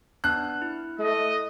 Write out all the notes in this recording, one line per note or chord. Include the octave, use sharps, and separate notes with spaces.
B3 D4 A5 F#6
E4
A3 D#5